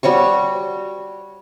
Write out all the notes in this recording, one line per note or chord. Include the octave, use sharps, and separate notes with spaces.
G3 F#4 C#5 C#6